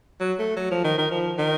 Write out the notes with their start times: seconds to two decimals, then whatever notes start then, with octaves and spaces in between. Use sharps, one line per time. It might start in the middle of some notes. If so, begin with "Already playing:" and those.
0.20 F#3
0.39 A3
0.56 F#3
0.71 F3
0.84 D#3
0.98 D#3
1.11 F3
1.38 D#3